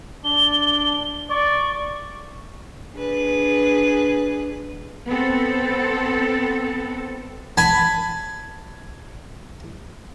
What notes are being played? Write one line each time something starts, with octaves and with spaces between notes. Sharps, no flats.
D4 G7
D5 C#6
D4 G#4 B4
B3 C4 A4
G#5 A5 B5